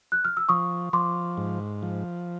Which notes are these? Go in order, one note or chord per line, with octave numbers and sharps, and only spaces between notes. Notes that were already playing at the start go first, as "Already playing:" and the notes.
F#6
F6
E6
F3 C#6 D#6
F3 C6 D6
G#2
F3